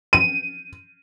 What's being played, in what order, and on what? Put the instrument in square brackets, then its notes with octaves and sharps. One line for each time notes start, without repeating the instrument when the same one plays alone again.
[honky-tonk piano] D#7